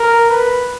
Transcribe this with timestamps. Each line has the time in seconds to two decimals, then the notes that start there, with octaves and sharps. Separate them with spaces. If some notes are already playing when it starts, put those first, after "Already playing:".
Already playing: A#4
0.30 B4